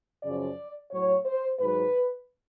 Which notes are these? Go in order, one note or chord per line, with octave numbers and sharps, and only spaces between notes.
F#2 C#3 F3 D5
A2 F#3 C#5
C5
G#2 D#3 F#3 B4